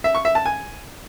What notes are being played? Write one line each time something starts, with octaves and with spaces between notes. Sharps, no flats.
E5
C#6
E5
A5
G#5